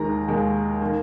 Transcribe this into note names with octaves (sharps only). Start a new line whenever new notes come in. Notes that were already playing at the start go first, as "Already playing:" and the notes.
Already playing: D#2 D#3 G#3 A#5
D#2 D#3 G#3
D#3 A#3